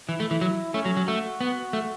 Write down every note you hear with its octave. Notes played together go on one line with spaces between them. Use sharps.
E3 E4
A3
E3
F#3
A3 C#4
F#3
F#3
A3 F#4
B3
A3